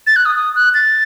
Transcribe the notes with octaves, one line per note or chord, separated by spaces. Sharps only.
A6
F#6
D#6
D#6
F#6
A6